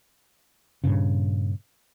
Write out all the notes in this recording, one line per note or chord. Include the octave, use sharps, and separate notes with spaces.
G2 A#2 C#3